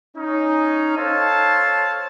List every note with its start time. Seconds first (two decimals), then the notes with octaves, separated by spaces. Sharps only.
0.17 C#4 D#4
0.97 A4 C5 C#5 F5 A5